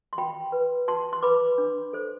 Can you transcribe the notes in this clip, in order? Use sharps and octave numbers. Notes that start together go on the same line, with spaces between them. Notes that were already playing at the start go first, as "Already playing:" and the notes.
C6
F#4 G5 B5
B4
F#4 A5 C6
C6
B4 B5 D6
D4
A4 C5